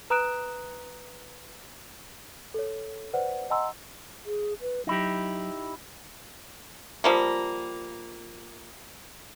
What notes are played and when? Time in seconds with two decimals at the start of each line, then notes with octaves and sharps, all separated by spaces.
0.10 B4 A#5 D#6 F#6 D7 E7
2.54 A4 C#5
3.13 B4 C5 D5 F#5
3.50 D#5 F#5 G#5 A#5 C6 E6
4.26 G#4
4.61 B4
4.87 F#3 D#4 E4 G4
7.04 F3 G3 A#3